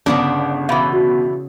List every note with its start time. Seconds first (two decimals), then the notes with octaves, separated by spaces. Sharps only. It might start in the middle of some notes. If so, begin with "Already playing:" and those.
0.06 G1 C#3 B3 D4 A#5
0.69 B2 E3 F5 B5
0.93 F#4